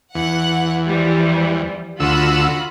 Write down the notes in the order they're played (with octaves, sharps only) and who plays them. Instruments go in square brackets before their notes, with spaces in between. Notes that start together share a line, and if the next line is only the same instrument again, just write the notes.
[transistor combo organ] E2 [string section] F#5
[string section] E3 F3 G3
[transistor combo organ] D2 E6 [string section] F4 F#4 B5